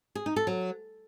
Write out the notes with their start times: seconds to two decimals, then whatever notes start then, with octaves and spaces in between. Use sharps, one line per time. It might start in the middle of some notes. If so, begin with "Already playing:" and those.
0.15 G#4
0.26 D#4
0.36 A4
0.47 F#3